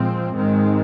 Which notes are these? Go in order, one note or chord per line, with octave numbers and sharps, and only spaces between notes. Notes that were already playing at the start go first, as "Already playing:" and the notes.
Already playing: A#2 F3 G#3 C4
G#2 D#3 G#3 C4